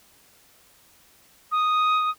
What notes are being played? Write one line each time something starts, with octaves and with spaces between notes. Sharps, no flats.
D#6